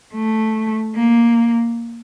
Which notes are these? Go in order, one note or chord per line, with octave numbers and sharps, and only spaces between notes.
A3
A#3